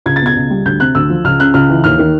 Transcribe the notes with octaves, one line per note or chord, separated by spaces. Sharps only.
C#2 G#6
A6
B2 G#6
C#2
G3
D2 G6
C3 F#6
D2 E6
F3
C#2 F6
C#3 F#6
C#2 F6
E3
D#2 F6
D#3